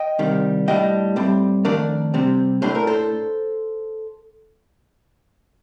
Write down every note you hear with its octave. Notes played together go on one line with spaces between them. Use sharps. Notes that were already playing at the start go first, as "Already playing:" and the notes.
Already playing: D#5 G5
C2 C3 D#3 G3
A2 G3 D4 D#5 G5
A2 G3 C4
F2 D#3 A3 D4 A#4 D5
C3 G3 C4
A2 A3 D4 C5
A#4
A4 C5